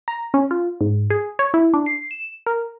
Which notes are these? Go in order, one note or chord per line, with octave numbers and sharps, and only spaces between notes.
A#5
C#4
F4
G#2
G#4
C#5
E4
D4
C7
E7
A#4